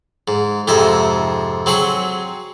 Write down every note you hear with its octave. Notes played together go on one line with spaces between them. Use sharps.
G#2
F2 G#2 C3 D#5 E5 G#5
F#3 C4 G#4 B5 C#6